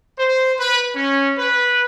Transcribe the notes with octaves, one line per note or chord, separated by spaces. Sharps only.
C5
B4
C#4
B4